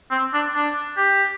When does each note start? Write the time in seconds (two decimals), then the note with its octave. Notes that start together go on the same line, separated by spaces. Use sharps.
0.11 C4
0.33 D4
0.55 D4
0.97 G4